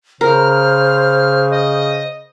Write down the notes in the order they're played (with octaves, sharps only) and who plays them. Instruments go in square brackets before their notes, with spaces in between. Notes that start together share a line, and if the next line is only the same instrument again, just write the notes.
[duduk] C#3 [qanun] A#4 [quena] C5 [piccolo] F6
[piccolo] D#5